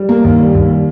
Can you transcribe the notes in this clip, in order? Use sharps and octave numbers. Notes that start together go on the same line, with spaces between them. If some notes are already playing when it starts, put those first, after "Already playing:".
Already playing: G3
A#3
D#2
G3
D#2
G3